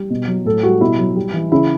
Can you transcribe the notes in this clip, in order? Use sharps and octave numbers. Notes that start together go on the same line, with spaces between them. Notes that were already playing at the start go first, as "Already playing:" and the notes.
Already playing: G3
B2
F#3
A2 A4
G3 F#4
B2 E4
F#3
G3
E3
C#3 E4